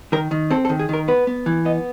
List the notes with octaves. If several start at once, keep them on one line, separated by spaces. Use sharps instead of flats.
D#3 A#4
D#3
C4 A4
A4
D#3
G#4
D#3 A#4
B3 B4
B3
E3
B3 D#5